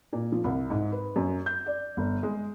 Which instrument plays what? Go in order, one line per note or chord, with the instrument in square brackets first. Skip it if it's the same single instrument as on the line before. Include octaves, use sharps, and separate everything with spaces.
[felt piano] A#2
F3
C2
G#2
B4
F#2
G6
D5
G1
G#3